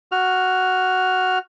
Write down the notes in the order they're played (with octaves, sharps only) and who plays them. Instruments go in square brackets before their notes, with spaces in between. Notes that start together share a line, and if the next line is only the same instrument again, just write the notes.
[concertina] F#4 F6